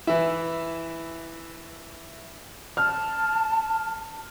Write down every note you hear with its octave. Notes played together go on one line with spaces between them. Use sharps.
E3 E4
A5 F6